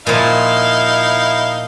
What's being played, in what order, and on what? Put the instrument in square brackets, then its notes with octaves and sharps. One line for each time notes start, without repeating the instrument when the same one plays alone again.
[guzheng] A#2 F3 [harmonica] D#4 E4 F5